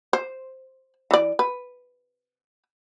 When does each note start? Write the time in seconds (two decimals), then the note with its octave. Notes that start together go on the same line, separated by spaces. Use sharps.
0.13 C5
1.11 E3 D5
1.39 B4